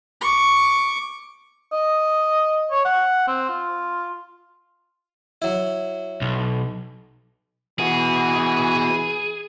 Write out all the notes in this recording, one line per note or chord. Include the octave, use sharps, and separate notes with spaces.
C#6 D6
D#5
C#5
F#5
C4
F4
F#3 E4
B1
E3 B3 F#4 G#4